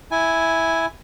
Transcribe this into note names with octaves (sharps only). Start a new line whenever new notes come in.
E4 G#5